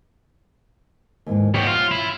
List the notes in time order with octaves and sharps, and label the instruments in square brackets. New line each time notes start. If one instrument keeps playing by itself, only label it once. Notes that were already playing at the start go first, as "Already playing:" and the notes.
[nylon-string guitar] D#2 G#2 E3
[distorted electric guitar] B3 G4 [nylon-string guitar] C#5
[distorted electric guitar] F4
E4